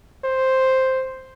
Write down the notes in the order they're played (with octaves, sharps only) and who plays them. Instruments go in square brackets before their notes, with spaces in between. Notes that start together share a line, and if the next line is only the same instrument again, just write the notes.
[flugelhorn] C5